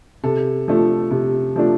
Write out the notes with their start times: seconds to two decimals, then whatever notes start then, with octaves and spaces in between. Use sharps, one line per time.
0.24 C3 A4
0.68 F3 A3 D4
1.11 C3
1.56 F3 A3 D4